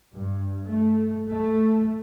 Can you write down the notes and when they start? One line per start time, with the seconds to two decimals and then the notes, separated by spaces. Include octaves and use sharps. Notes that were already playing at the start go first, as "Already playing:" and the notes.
0.13 G2
0.68 A3
1.31 A3